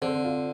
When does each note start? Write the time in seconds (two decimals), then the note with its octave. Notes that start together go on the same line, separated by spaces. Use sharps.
0.02 D3 C4
0.24 F4